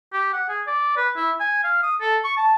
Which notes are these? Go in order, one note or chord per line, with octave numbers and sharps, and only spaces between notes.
G4
F#5
G#4
D5
B4
E4
G#5
F5
D#6
A4
C#6
A5